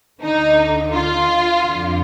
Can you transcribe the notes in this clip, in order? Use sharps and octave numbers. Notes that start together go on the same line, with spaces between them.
D2 D3 D#4
F4
F2 D3